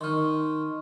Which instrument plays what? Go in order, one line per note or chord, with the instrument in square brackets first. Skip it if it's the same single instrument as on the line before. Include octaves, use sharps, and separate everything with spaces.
[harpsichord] D#3 D#4 [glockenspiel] C6 C#6 F6